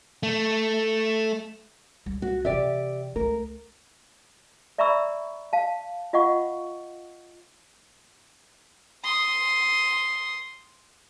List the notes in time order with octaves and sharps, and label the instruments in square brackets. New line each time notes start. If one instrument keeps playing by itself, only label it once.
[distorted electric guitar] A3
[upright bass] C#2 G3
[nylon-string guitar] F#4
[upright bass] C3 E3 [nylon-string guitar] G4 D5 E5
[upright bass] C#2 A3 [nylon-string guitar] A#4
[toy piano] D5 E5 A#5 B5 C#6 E6
F5 A5
F4 D#5 F5 F#5 C#6
[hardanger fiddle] C6 D#6